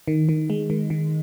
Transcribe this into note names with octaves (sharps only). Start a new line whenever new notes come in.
D#3
D#3
G#3
D#3
D#3